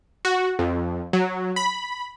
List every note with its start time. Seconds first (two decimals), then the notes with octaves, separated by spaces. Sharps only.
0.25 F#4
0.59 F2
1.13 F#3
1.56 B5